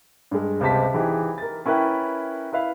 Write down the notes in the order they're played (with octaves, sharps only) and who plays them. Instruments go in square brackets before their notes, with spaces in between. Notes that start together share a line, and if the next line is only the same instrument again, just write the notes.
[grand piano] G2 G#3
C#2 C3 C5 A5 B6
E3 D#4 G4 G#4
A#4 A6
C#4 E4 A#4 B4 G5
E4 B4 E5 F5